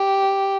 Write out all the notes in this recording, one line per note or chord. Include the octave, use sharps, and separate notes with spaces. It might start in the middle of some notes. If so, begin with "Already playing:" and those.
Already playing: G4